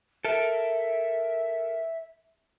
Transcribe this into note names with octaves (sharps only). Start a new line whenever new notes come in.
A4 A#4 E5